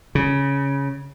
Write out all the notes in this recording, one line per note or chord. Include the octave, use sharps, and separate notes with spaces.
C#3